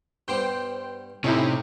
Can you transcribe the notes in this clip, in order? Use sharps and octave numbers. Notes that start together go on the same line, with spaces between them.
G2 B3 G4 C5 G5
A2 C3 C#4 D#4 E4